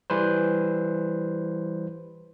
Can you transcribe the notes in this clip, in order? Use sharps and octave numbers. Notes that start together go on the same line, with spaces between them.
E3 G3 B4 C5